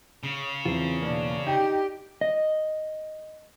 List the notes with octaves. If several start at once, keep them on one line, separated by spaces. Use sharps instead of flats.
C#3
E2 C4 F4
B2 A#3 D4
D#4 G4 G5
D#5